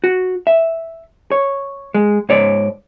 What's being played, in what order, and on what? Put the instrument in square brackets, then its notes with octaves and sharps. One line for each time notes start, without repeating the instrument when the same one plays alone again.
[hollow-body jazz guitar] F#4
E5
C#5
G#3
G#2 C#5 D5